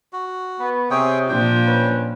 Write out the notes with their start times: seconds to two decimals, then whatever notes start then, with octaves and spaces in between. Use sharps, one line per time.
0.13 F#4
0.60 B3
0.91 C3 G#4 C#5 G5
1.29 A#2 F3 D4 C5 G5
1.67 C#4 B4